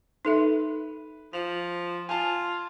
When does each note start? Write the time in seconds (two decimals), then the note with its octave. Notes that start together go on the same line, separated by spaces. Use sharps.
0.25 D#4 A4 B4 E5
1.33 F3 F7
2.09 F4 G#5 A5